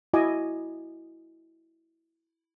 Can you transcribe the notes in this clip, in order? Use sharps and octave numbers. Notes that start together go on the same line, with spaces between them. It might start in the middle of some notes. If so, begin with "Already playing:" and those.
E4 F#4 D#5 G#5 D6